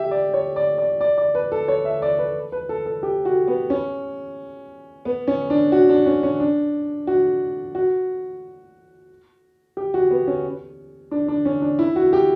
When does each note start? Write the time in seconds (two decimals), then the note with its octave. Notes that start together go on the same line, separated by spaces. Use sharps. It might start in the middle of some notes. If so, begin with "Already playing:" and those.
Already playing: G4 E5
0.11 D5
0.34 C#5
0.56 D5
0.78 D5
1.01 D5
1.18 D5
1.35 B4
1.52 A4
1.68 C#5
1.85 E5
2.02 D5
2.19 B4
2.52 B4
2.69 A4
2.86 A4
3.03 G4
3.25 F#4
3.47 B3
3.70 C#4
5.05 B3
5.28 C#4
5.50 D4
5.72 F#4
5.89 D4
6.06 C#4
6.23 C#4
6.40 D4
7.07 F#4
7.75 F#4
9.77 G4
9.94 F#4
10.10 B3
10.27 C#4
11.11 D4
11.28 D4
11.45 C#4
11.62 D4
11.79 E4
11.96 F#4
12.13 G4